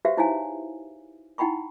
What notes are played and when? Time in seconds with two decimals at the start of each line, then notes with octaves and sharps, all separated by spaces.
0.05 F#4 G4 B4 C5 E5 F5
0.17 D#4 E4 C5 C#5 F5 G#5
1.38 D#4 E4 F#5 G5 B5 C#6